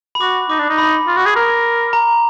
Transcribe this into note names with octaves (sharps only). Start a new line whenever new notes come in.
B5
F#4 D6
D#4 D6
D4
D#4
B5
F4
F#4
G#4
A#4
A#5